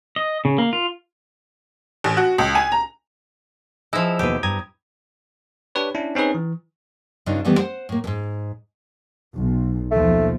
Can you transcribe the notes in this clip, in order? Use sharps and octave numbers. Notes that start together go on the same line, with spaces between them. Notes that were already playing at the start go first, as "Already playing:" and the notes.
D#5
C#3
A#3
F4
A1
F#4
C#2
G#5
A#5
F3 E4 G#4 D#5 E6
D#2 B2 G4 B4
G2 A#5 D#6 G#6
D4 G4 B4 C#5
C#4 D4 E4
C4 C#4 D#4 G#4 B4
E3
G2 C#3 D4 D#4 F4
D#3 E3 G3 A3 B3
C5 F#5
A2 A#3
F2 G#2
B1
D#2 B2 F3 A3